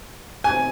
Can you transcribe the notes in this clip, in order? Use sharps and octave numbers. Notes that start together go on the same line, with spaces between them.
G#5